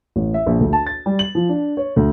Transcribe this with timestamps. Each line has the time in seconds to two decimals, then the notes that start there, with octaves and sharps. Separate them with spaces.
0.16 A1
0.34 E5
0.46 A#1
0.60 D2
0.73 A5
0.86 A6
1.06 G3
1.19 F#7
1.35 F3
1.49 D4
1.77 C#5
1.96 D2